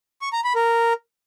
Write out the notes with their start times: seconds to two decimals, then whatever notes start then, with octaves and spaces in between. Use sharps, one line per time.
0.21 C#6
0.33 A#5
0.44 B5
0.56 A#4